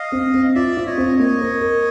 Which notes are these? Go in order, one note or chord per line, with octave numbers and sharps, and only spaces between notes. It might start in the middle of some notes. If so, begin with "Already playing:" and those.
Already playing: D#5 F5
C4
C4
F4 D5 E5
F4
C#5 D#5
C4
A#3 C#5 D#5
A#4
A#4